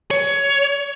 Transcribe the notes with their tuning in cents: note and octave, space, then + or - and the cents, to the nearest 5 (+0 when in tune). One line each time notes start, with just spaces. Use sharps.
C#5 +20